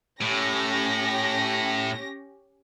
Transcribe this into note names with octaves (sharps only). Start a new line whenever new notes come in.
A2 C#4 G4 A#6